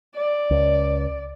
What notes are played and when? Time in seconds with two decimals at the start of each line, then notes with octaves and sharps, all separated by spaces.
0.15 D5
0.51 C#2